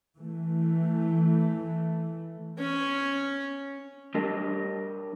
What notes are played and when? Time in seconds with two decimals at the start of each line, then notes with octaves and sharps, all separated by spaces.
0.17 E3 A3
2.59 C#4
4.15 G3 D4 G4 A#4 D#5